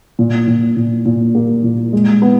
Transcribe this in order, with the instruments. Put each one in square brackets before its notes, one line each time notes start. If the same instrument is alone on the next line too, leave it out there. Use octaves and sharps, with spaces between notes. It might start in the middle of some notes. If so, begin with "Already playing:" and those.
[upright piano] A#2
A#2
A#2
A#2
A#3
A#2
G#3
B3